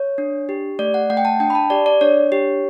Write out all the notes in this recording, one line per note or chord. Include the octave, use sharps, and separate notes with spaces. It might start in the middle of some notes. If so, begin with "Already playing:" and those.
Already playing: C#5
D4
G4
A3 D5
F#5
A3 F#5
G5
A5
D4 G5
B5
A5
G4 D5
D5
D4 C#5
G4